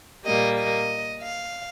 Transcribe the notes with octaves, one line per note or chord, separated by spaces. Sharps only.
A#2 G3 A#3 D#5
D#5
F5